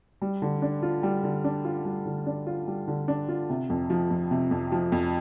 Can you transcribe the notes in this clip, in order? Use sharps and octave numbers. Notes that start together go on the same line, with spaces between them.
G3
D3
D4
F4
G3
D3
D4
F4
G3
D3
D4
F4
G3
D3
D4
F4
C3
F2
F3
F2
C3
F2
F3
F2